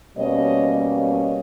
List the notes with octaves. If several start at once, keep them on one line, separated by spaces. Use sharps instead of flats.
B2 G3 A#3 C#4 C#5 D#5
C#5 D#5